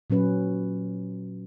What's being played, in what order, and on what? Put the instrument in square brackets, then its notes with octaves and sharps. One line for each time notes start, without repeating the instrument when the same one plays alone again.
[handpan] A#2 F#3 C#4 B4